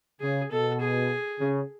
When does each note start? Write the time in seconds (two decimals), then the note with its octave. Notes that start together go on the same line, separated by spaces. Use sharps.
0.20 C#3 G#4
0.51 B2 A4
0.80 G#4
1.40 C#3